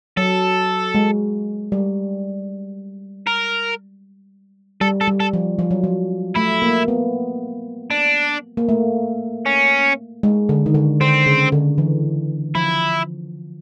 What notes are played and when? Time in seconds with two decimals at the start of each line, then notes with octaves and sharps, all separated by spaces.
0.17 F#3 A4
0.95 G#3
1.72 G3
3.27 A#4
4.81 G3 A4
5.01 A4
5.08 G3
5.20 A4
5.33 F3
5.59 F3
5.71 F#3
5.84 F3
6.36 A3 E4
6.62 A#3
6.88 B3
7.91 D4
8.57 A#3
8.69 A3
9.46 C#4
10.23 G#3
10.49 D3
10.66 D#3
10.75 D3
11.01 D3 C4
11.26 C#3
11.52 D3
11.78 E3
12.55 F3 E4